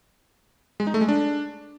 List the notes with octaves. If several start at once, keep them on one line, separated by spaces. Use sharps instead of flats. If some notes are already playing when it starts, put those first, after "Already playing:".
G#3
D#4
A3
G#3
D4